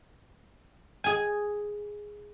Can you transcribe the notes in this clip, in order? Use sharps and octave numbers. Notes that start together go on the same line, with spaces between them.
G#4 G#5